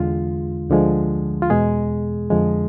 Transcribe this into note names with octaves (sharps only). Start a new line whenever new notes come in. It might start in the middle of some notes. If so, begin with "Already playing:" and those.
Already playing: E2 D3 G#3 F4
D2 D3 F3 G#3
F4
E2 B2 G#3 G#4
F2 D3 F3 G#3